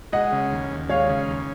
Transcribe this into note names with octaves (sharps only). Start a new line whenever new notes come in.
G#3 D#5 F#5
C#3
D#2
D#2
G#3 C#5 F5
C#3
D#2